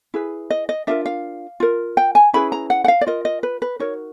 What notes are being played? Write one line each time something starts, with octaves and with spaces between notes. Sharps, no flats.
E4 G#4 B4
D#5
D#5
D4 F4 A#4 E5
F5
F4 A#4
G5
G#5
C#4 E4 G#4 B4 B5
A#5
F#5
F#5
F5
D5
F4 A#4 D#5
D#5
B4
B4
D#4 F#4 A#4 C#5